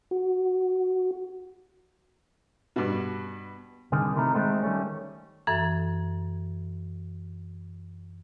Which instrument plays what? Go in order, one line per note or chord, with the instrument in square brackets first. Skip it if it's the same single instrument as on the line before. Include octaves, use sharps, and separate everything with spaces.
[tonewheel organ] F#4
[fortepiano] G2 B2
[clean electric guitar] C2 D3 D#3 G#4
C3 D#3 A3 E4 A#5
D#3 G#3 A3 C4 D#4
D#3 G3 A3 C#4
[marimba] F#2 E3 A4